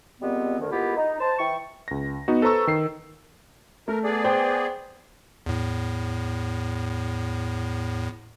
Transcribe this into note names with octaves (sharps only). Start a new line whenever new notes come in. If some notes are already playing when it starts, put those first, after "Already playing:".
A#2 G3 G#3 B3 C4
D2 D#3
G#3 A#3 B3 E4 F4 G4
D#4
C5 A5
E3 E4 G5 C#6
C#2 A#6
B3 D#4 F#4
A4 B4 C5 A#5 C#6 E6
D#3 C7
A3 A#4
B3 G#4 D5
C5 G5
E2 A2